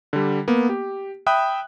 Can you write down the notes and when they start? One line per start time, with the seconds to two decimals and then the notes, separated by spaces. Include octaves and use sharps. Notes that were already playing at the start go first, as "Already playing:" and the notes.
0.13 D3 G3
0.48 A#3 B3
0.69 G4
1.26 E5 G5 B5 D#6 F#6